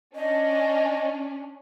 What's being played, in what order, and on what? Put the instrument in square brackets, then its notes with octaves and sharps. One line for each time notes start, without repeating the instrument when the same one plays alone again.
[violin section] C#4 D4 [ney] D#5